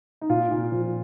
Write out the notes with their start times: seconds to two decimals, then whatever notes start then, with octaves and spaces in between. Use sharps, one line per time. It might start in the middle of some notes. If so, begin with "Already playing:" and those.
0.21 D#4
0.29 A#2 F4
0.51 A#2
0.72 F3